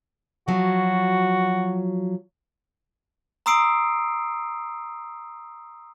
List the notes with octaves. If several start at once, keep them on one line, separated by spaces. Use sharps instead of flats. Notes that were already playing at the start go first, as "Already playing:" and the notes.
F3 F#3 F#4
A#5 C6 D#6 E6 C7 D7